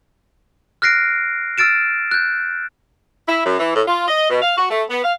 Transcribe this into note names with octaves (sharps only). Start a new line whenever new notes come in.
F6 F#6 A#6 C7 D7
E6 F6 A6 D7 E7
F#6 G6
E4
F#2
E3
A2
F4
D#5
B2
F5
F#4
A3
B3
F5